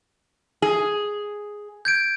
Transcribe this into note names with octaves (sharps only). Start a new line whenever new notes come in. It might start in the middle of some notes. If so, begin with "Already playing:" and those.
G#4
G6 G#6 D7